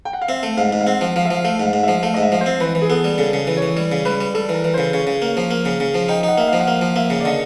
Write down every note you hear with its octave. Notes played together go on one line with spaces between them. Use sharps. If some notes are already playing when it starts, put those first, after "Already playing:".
G5
F#5
F5
C4 E5
A3
G#2 F5
G#2
F5
C4 F#5
F3
F3 F5
E5
F3 F5
A3 F5
G#2 F5
G#2
F3 E5
A3 F5
D#5
G#2
E5
F3
C5
C4
E3 B4
E3
G#4
B3 A4
G3
C#3 A4
C#3
E3
C#5
E3
G3
C#3
G3 B4
G3
G3 A4
E3 A#4
E3
C#3 C5
C#3 C#5
C#3
A#3
F3
A#3
C#3
C#3
F3
D#4 G5
D#4 F#5
A#3 E5
F3 F5
F#5
A#3 F5
F3
A#3 E5
C#3
D5
D3 D#5